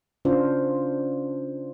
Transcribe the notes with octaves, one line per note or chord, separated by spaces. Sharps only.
C#3 C#4 D4 F4 C5